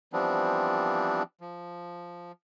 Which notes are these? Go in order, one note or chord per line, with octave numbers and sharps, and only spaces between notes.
E3 F3 G3 B3 C4 D4
F3